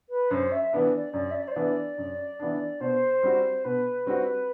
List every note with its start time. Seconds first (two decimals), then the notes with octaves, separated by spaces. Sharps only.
0.10 B4
0.31 F#2 C5
0.51 E5
0.73 E3 B3 D4
0.94 D5
1.13 F#2 D5
1.31 E5
1.35 D5
1.48 C5
1.52 E3 B3 D4 D5
1.98 F#2
2.39 E3 B3 D4
2.80 B2 C5
3.23 G3 C4 F#4
3.64 B2 B4
4.06 G3 C4 F#4